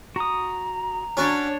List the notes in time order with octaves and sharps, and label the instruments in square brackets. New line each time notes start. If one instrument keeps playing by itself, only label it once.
[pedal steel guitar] F#4 D#6 [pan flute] A#5
[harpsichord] C#4 F#4 [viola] D4 C#5